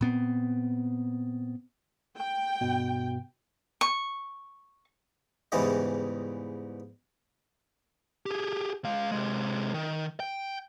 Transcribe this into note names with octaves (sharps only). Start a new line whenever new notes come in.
A#2 B3 C4
G5
G2 B2
C#6
E2 G#2 C#3 E3 G3 G#3
G4 G#4
G#3 F5
C3 G#3
D#3
G5